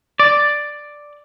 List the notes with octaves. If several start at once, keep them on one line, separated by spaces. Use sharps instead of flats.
D5